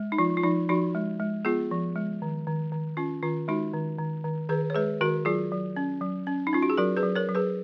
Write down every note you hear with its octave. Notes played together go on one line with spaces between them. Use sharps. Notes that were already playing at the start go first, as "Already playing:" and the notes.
Already playing: G#3
D#4
F3 F4
F4
F3 D#4
F3 D#4 F#4
G#3
G#3
B3 F4 G#4
F3
G#3
D#3
D#3
D#3
C#4 F4
D#3 F4
G#3 D#4 F#4
D#3
D#3
D#3
D#3 G#4 B4
C#5
G#3 G#4 B4
D#3 F#4 A#4
F#3 F4 G#4
F#3
C#4
F#3
C#4
D#4
C#4 F4
F#4
G#4
F#3 F#4 A#4
G#4 B4
F#3
A#4 C#5
F#3
G#4 B4